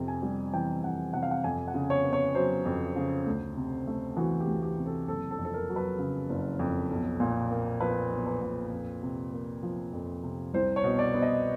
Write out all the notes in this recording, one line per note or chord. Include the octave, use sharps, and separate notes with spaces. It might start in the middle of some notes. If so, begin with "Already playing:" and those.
Already playing: F2 C3
G#5
G3
E3 G5
F2 F#5
C3 F#5
F5
F#5
F2 G#5
F#5
C#3
C#5
B3
C#5
F#3 C5
F2
C#3
D2
C3
A3
E3 F#4
G4
D2
G4
C3
A4
F#1 A4
A4
F2
A4
A#4
F#3
B4
C#3
F#1
F2
B1
A#2
A#3
F3 B4
B1
B4
A#2
F2
C3
A#3
F3
F2
C3
C2 C5
C#5
B2
D5
B3
D#5